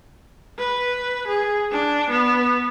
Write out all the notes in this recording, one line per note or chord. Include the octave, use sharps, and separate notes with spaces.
B4
G#4
D4
B3